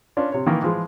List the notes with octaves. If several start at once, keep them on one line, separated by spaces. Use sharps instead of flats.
C#4 D4 F4
C3 C#5
D#3 E3 A#3
E3 F3 G#3